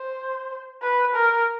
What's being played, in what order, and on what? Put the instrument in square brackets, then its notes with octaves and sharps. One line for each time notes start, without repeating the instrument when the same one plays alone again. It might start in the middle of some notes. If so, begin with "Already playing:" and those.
Already playing: [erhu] C5
B4
A#4